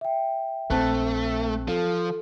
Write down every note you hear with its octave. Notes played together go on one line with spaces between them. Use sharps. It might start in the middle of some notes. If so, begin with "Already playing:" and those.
E5 G5
A#1 A3 C4 A5 F#6
F3 A4